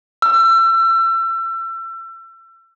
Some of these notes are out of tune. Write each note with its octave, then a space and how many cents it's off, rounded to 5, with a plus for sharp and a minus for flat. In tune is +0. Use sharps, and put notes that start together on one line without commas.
E6 +35